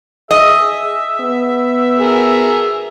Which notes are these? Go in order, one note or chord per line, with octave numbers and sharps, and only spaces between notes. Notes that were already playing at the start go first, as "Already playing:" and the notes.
G#4 D#5 E5
B3
G#4 A#4